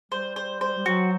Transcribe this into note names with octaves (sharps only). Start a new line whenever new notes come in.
G3 C5
C5
C5
G3
F#3 F#4